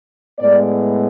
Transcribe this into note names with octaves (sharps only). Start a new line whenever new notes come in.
A2 G#3 B3 D5